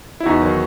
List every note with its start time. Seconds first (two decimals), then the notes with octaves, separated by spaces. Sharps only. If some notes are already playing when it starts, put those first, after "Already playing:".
0.20 E4
0.26 E2 D#4 F#4
0.42 D#3 F#3